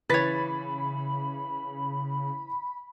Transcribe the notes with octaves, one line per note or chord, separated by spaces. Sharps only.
C#3 E3 B4 C#5 B5 A6 B6